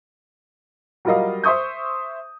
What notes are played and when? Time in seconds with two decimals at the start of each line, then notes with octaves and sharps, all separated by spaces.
1.05 F#3 G3 F4 A#4 D#5 F5
1.44 C5 E5 C#6 D#6 G6